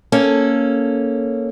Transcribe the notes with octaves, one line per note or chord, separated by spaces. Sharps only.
A#3 C#4 A4